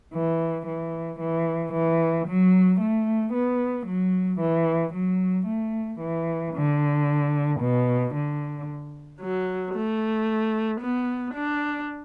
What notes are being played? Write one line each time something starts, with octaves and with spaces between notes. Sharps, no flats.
E3
E3
E3
E3
F#3
A3
B3
F#3
E3
F#3
A3
E3
D3
B2
D3
F#3
A3
B3
D4